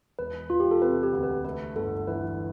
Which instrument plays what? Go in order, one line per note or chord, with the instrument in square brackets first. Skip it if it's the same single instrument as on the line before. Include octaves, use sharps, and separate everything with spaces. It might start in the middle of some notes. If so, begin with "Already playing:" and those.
[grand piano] E1 [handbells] B4
[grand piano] E1 [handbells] F4
[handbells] G4
A4
[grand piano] C3 [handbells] B4
[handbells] G4
[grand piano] D2
[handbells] B4
[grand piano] A3 [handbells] B4
[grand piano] G1 [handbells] A4
[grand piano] E3 [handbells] B4